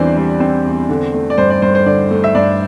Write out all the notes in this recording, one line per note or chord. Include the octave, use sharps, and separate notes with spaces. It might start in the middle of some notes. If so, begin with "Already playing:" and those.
Already playing: E2 E3 G3 C4 D4 E4 C5 D5
G3
C4
E2
D3
A3
D5
G2 C5
D5
G2 C5
C5
D3 D4 D5
A3
E5
G2 D4 D5